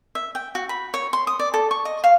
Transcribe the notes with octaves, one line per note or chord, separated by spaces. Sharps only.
E5
G5
F#4
B5
C#5
C6
D#6
D5
A4
C#6
D#5
F5